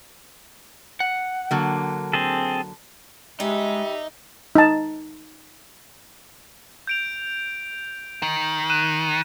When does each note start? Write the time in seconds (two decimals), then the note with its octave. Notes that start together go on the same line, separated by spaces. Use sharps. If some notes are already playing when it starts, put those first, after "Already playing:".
1.00 F#5
1.51 D3 F#3 A#3
2.13 C4 G#4 A4
3.40 G3 G#3 D#4 E5
4.55 D#4 A5
6.87 G6 D7 F7
8.23 D#3
8.70 F#6 D#7 E7